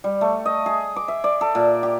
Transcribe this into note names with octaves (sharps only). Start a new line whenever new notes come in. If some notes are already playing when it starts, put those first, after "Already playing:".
G3
A3
D#5
G#4
D6
E5
D5
A4
A#2
G4